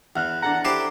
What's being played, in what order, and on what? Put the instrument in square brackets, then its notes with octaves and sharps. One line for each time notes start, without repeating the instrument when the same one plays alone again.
[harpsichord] E2 [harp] F#5 F6 F#6
[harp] D4 A4 A#5 [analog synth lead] F#5
[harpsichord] E4 G4 C5 [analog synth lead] D6